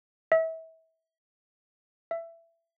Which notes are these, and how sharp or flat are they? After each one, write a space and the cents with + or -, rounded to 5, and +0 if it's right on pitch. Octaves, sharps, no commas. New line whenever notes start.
E5 -30
E5 +20